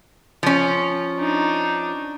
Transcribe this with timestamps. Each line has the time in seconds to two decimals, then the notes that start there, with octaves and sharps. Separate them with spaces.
0.43 F3 C#4
1.19 D4 D#4